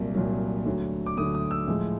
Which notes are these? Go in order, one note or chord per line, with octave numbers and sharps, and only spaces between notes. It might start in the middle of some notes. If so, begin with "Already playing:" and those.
Already playing: C2 A#2 F#3
C2 A#2 F#3
D2 D3 F#3
D6
D2 D3 F#3 D#6
D#6
E6
A2 F3 G#3